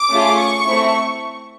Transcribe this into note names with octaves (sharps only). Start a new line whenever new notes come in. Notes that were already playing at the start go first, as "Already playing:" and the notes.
Already playing: D6
A3 C#4 F4 G#4
C#6
A3 C4 E4